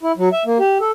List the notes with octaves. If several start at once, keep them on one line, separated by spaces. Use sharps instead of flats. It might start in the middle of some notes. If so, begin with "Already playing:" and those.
E4
F#3
E5
A#3
G4
A4